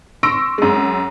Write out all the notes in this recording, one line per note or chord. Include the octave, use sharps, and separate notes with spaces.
C6 C#6 E6 A#6 D7
F#2 G#3